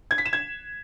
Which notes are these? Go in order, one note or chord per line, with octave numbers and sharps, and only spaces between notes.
G#6
B6
E7
G#6